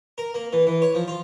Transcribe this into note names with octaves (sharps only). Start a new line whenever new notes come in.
A#4
A#3
E3
E3
C#5
F3
F4